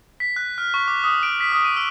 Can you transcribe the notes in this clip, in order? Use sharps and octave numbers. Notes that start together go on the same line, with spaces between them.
B6
F#6
F6
C#6
D6
D#6
D7
B6
D#6
D#7
E6